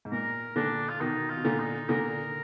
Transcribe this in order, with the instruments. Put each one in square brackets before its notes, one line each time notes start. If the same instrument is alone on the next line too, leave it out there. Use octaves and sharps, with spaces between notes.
[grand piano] G#2
[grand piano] A#2 [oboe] A#4
[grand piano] A#2 D3 [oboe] D4
[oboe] F4
[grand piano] B2 D#3 [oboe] D#4
[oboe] F4
[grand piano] B2
A#2 D3
[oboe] D#4
[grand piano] A#2 D3 [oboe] A#4